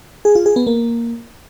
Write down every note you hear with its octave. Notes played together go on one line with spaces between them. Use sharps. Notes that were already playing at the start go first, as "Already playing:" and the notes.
G#4
F4
G#4
B3
A#3